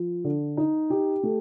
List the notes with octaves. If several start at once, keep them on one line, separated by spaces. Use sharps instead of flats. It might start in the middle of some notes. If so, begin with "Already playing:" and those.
Already playing: F3
D3
D#4
G4
A3